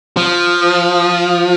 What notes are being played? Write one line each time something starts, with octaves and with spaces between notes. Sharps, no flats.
F3